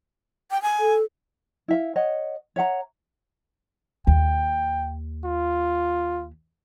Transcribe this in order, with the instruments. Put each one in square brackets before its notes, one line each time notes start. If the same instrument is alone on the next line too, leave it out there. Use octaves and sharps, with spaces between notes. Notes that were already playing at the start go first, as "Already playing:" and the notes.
[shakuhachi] G5
G#5
[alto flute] A4
[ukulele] E4 E5 F5
C#5 D#5 F#5
C#5 E5 F#5 A#5
[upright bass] D#2 [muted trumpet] G5
[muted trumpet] F4